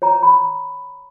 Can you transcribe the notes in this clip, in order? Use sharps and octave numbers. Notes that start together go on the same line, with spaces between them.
C#5 A#5
B5